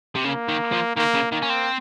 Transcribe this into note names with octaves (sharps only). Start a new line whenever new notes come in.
C3
C#3 A#3
D#3
F3
D#3 A#3
C#3
D#3 A#3
C#4
C4